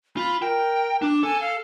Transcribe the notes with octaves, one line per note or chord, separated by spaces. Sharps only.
F4 B5
A#4 G5
D4 D6
A4 G#5
F5